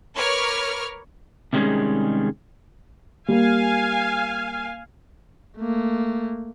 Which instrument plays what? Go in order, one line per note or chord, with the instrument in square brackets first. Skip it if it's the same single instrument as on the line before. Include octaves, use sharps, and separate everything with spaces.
[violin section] A#4 B4 C#5 D6 F6 G#6
[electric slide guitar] C3 D#3 G3 G#3 C#4 G#4
[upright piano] G3 A#3 [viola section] F5 G#5
[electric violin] A3 A#3